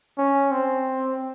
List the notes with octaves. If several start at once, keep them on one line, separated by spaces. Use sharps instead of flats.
C#4
C4